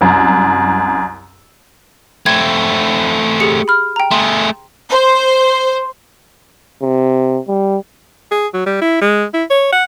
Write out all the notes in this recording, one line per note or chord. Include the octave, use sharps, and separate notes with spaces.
C2 F#2
A3 C4 G#6
G4 G#4 C#7
B5 F6
G5 A#5
A3 G#4 C6
C5
C3
G3
G#4
F#3
G3
E4
G#3
E4
C#5
F#5